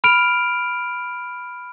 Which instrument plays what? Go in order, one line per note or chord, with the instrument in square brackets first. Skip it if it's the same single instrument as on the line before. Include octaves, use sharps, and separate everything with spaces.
[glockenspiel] B5 F6 D7 F7